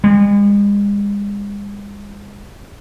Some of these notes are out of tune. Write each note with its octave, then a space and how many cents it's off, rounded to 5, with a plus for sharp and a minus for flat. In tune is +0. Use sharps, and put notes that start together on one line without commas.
G#3 -40